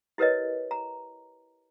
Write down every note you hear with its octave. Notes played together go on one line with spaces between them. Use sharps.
E4 G4 A#4 B4 C#5 D#5
A#5